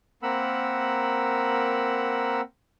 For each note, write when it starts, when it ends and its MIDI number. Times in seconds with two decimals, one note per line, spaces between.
0.23 2.41 58
0.23 2.41 60
0.23 2.41 70
0.23 2.41 78
0.23 2.41 83
0.23 2.41 88